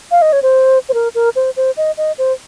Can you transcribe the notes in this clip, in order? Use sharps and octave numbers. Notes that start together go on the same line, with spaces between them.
F5
D#5
C#5
C5
C5
A#4
A#4
C5
C5
D#5
D#5
C5